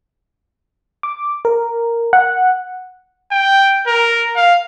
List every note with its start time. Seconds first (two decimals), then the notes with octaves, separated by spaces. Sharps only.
1.03 D6
1.45 A#4
2.13 F#5
3.32 G5
3.87 A#4
4.36 F5